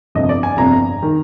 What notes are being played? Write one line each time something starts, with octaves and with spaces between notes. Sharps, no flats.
G1 F2 C3 D#5
D5
G#5
G1 F2 C3 A#5
D#3